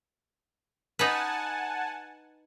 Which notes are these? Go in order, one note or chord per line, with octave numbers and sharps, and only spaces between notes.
D#4 B4 F#5 G#5 A5